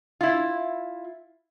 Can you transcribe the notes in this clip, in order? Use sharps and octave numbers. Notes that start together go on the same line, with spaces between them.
E4 F4